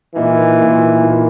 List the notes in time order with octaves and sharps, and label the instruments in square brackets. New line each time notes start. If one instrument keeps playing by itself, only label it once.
[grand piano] A#2 A#3 D#4 [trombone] E3
[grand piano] A#2 A#3 D#4
A#2 A#3 D#4